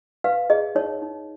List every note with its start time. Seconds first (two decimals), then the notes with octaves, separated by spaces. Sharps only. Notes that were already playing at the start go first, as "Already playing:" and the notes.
0.24 B4 F5
0.50 G#4 D#5
0.75 D#4 C#5
1.02 D#4